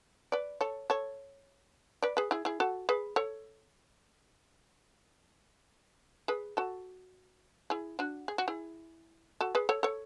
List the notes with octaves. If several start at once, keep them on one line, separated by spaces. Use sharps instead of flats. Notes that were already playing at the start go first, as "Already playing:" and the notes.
B4 D5
A4 C#5
A4 C#5
B4 D5
G#4 B4
E4 G#4
E4 G#4
F#4 A4
G#4 B4
A4 C#5
G#4 B4
F#4 A4
E4 G#4
D4 F#4
G#4
F#4
E4 G#4
F#4 A4
G#4 B4
A4 C#5
A4 C#5